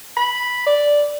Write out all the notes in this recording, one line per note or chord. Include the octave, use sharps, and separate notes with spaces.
B5
D5